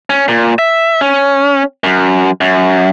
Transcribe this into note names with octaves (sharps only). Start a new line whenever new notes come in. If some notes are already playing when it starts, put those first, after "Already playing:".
C#4
A#2
E5
C#4
F#2
F#2